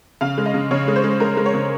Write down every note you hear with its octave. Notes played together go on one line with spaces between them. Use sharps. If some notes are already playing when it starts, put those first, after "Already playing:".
C#3 F5
G#3
D#5
C#3
C#3 C#5
G#3
C5
G#3
G#3 A#4
G#3
C#5
C#3